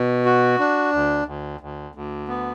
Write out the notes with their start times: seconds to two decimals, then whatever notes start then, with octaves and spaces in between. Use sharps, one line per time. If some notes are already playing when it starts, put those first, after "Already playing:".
Already playing: B2
0.25 F#4
0.59 D4
0.93 D2
1.26 D2
1.61 D2
1.95 D2
2.28 B3